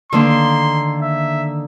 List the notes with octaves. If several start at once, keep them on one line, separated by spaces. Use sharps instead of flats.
D3 D#3 A#3 C6
E5